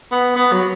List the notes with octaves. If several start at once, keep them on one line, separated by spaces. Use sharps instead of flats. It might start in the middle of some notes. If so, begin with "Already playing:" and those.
B3
B3
F#3